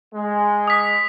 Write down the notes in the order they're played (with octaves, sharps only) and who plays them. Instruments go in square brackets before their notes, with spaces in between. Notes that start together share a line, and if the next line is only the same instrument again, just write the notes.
[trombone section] G#3
[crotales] D#6 B6